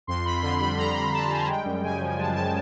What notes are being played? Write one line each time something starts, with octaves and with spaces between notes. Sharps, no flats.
F2 C6
F2 B5
D3 C6
G3 B5
F2 A#5
F2 B5
D3 A5
G3 G#5
G#3 G5
F#2
C#3 G#5
F3
G#3 A5
F#2 A5